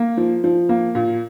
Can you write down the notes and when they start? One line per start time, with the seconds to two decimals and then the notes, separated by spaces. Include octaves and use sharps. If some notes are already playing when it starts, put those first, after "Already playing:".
Already playing: A#3
0.17 F3
0.44 F3
0.69 A#3
0.95 A#2